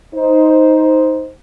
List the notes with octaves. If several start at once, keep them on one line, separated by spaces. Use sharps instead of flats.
D#4 C5